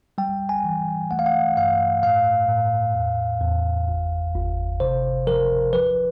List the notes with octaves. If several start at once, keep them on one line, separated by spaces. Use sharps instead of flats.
G3 G5
G#5
E3
A3 F#5
F5
F#5
G2 F5
A2 F5
A2
E2
E2
G1
G1
C3 C5
F3 A#4
F3 B4